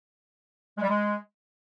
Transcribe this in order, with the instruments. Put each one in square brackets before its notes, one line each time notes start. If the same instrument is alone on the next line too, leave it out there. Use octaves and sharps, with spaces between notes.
[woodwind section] G#3
G3
G#3